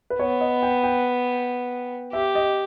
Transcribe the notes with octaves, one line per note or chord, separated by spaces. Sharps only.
B4
B3 C#5
D#5
G5
G5
G4 E5
D#5